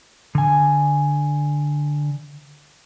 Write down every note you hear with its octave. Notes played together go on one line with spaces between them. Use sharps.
D3 G#5